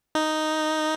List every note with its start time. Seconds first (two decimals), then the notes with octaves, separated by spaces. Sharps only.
0.15 D#4